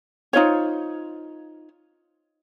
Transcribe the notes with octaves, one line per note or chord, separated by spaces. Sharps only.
D#4 F4 C5 C#5